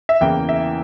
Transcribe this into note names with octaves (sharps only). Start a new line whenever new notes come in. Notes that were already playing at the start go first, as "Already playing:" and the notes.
E5
E2 C#3 E3 A#3 E4 G5
E5